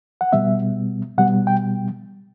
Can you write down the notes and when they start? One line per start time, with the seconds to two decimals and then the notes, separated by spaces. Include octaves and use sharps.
0.21 F#5
0.33 B2 G3 B3 E5
1.18 B2 G3 B3 F#5
1.47 G5